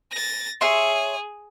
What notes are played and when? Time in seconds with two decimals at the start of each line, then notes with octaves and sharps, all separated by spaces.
0.12 A6 A#6
0.61 G#4 C#5 E5 C6